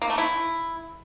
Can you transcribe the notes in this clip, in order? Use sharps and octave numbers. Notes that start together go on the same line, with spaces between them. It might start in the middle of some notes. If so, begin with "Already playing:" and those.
A#3
A3
E4